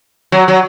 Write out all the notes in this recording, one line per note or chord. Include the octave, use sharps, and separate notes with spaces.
F#3
F#3